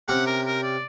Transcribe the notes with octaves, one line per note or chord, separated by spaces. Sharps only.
C3 C#4 G4 F#5
A#4
A#4
D5